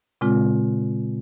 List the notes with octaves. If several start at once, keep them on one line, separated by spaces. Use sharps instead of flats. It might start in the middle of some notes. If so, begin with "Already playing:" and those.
A#2 C#3 G#3 C4 F4